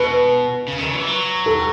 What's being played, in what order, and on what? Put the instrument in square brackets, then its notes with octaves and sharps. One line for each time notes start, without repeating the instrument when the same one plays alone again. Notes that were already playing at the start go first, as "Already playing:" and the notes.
Already playing: [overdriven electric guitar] B2 [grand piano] B4
[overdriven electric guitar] C#3
D#3
C#3
F#3
E3
F#3
[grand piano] A4